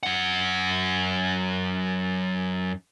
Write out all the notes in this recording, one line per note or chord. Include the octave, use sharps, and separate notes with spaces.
F#2 F#5